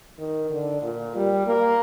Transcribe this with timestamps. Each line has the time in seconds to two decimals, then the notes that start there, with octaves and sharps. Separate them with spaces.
0.19 D#3
0.51 D3
0.83 A#2
1.16 G3
1.47 A#3